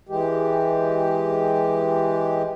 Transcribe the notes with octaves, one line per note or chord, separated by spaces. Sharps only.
E3 G#3 G4